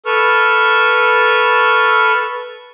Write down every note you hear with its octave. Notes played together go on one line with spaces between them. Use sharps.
A4 B4 C#6 E6 F6